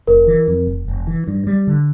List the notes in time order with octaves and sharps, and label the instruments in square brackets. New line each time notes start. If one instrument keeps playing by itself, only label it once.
[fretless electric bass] F1 [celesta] A#4
[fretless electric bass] E3
F2
F1
F1
E3
G2
G3
D3